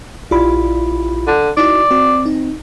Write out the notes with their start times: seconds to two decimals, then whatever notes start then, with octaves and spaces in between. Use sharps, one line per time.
0.31 A#1 E4 F4 G4 D5 B5
1.27 D3
1.57 D#4 E4 F#4 D5
1.91 C4 F#4
2.26 D#4